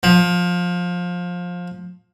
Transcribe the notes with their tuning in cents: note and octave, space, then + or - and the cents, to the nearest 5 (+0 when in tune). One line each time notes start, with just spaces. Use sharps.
F3 +20